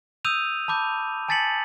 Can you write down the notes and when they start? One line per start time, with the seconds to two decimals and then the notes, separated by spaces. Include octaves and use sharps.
0.25 D#6 E6 G6 D#7 F7
0.68 A5 B5 D6 G6
1.29 G#5 A5 A6 B6 C#7 F#7